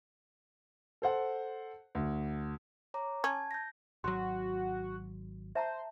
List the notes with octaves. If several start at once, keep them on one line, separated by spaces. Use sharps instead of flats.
A4 C5 F#5
D2
C#5 A#5 D6
C#4 A5 G#6
G6 A#6
G#1 F#3 F#4 C6
C5 E5 A5 A#5